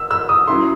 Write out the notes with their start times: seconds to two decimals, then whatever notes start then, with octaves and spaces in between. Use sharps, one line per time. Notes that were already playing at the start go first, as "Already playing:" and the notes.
Already playing: E6
0.11 E6
0.29 D#6
0.47 F#3 C#4 E4 C6